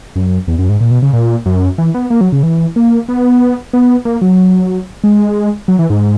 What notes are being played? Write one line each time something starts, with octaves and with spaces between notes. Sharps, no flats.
F#2
E2
F#2
G#2
A#2
B2
C#3
A#2
F#2
E3
B3
A#3
F#3
C#3
E3
A#3
B3
B3
A#3
F#3
G#3
F#3
E3
G#2